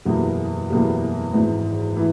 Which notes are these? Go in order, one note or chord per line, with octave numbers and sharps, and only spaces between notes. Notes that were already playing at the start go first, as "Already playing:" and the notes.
F#1 E2 B2 G3 A#3
F#1 E2 B2 G3 A#3
G#1 G#2 E3
E3